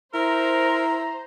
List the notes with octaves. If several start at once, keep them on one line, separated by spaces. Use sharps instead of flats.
E4 A#4 C5 A#5